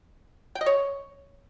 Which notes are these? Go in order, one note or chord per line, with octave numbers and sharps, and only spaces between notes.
G5
D#5
C#5